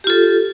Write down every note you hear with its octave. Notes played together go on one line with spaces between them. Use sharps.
F4 G4 A4